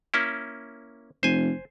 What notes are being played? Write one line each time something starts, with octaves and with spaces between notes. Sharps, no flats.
A#3 C#4 E4
F1 C5 G#5